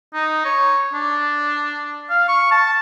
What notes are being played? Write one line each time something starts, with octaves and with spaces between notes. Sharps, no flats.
D#4
C#5
D4
F5
C#6
A5